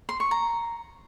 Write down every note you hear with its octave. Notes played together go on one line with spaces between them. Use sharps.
C6
C#6
A#5